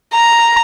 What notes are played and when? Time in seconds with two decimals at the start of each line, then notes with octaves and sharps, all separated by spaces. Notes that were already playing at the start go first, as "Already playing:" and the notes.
0.14 A#5